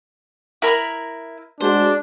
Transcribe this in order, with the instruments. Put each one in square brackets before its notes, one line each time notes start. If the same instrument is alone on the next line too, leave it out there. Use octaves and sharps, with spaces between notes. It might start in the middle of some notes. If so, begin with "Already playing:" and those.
[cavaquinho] E4 A#4 B5
[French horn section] G#3 F#4 [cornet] D4 [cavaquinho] C5